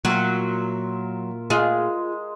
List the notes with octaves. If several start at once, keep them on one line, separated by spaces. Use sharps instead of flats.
A#2 F#3 F4 A#4 E5
G#3 F4 G#4